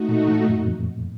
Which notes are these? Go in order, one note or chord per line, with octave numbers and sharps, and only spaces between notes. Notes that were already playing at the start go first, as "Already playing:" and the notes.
Already playing: A3 D#4 F#4
A#2
A2
F#2
F2